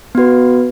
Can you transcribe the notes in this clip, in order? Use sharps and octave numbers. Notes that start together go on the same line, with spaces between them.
B3 F#4 B4